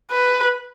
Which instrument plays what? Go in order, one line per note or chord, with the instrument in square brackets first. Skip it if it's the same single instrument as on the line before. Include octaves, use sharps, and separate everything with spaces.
[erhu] B4